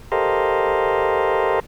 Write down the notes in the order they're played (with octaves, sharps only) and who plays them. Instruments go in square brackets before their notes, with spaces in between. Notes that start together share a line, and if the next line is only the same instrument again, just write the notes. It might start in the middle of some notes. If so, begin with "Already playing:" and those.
[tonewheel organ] G4 A4 A#4 C5 D#5 F5